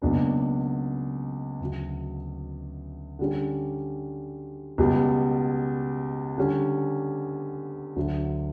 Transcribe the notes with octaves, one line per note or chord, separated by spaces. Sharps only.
C#2 B2 F#3 A#3 D4
D2 C#3 F#3
D3 G3 C#4
C#2 B2 G3
D3 G3 C#4
D2 D3 F#3